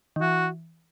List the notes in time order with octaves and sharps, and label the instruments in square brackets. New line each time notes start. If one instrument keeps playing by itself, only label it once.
[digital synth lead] D#3
[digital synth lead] E3 [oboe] F#4